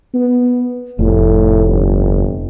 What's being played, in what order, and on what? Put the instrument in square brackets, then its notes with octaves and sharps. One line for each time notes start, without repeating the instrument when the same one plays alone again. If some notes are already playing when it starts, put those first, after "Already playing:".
[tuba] B3
[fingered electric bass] F1 [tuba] A2
[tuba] G1